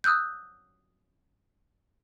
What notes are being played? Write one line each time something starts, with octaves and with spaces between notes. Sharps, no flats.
D#6 E6 F#6 G6